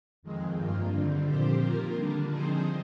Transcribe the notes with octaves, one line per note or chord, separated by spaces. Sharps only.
F2 D#3 G#3 C4
G2 D#3 A#3 F4
D3 G3 C4
A#2 F3 C4 G4 C5
D#3 A#3 F4 A#4
D3 G3 A#3 D4
F3 C4 D#4 G#4 C5